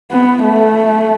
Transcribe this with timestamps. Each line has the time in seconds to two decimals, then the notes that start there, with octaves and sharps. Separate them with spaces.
0.12 B3
0.44 A3